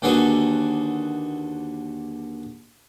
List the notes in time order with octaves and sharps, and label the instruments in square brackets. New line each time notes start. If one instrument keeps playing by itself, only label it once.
[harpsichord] D#2 D3 F#4 G#4 A4 B4